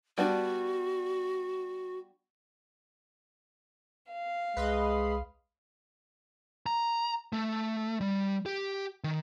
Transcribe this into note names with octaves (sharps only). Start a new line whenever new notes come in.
G3 B3 D4 F#4
F5
C2 G#3 B4 D#5 C6
A#5
A3
G3
G4
D#3